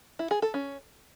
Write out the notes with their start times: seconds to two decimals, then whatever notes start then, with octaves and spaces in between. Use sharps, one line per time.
0.19 E4
0.31 G#4
0.42 A4
0.54 C#4